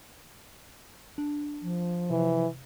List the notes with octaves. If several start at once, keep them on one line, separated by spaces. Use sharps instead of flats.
D4
F3
C3 E3